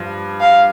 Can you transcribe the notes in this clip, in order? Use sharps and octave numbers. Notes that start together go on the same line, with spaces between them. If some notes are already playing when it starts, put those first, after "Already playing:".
Already playing: G2 F3
F5